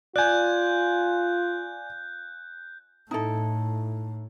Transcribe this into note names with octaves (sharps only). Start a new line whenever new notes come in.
F4 D5 G#5 F#6 G6
A2 D#4 E4 A4